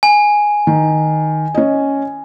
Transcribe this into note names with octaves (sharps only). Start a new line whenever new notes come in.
G#5
D#3
C#4 D#5